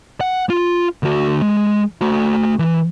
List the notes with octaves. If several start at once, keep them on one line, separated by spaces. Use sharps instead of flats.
F#5
F4
D2 F#4
G#3
A3 F#4
E3